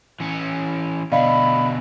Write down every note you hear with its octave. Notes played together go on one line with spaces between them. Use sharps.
E3 C#4
B2 D3 D5 D#5 F5 B5